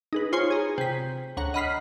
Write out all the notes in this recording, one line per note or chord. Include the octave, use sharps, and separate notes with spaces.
D#4 G#4 B4
F4 C5 C#5 G#5 C6
G#4 A#5
C3 B6
D2 C#5 F#5 A#5
D#5 F#5 B5 F6 B6 C7